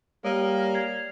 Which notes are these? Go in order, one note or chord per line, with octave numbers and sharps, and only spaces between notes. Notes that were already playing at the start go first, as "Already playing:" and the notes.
G3 A#3 C#5 D5 F6
G#6 C7 F7